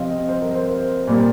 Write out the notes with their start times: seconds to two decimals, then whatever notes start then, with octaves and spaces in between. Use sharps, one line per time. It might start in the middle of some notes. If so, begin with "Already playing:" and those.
Already playing: C3 F3 C4 D#5 F5
0.10 D#5
0.29 C5
0.42 A#4
0.55 C5
1.07 A#2 G3 A#3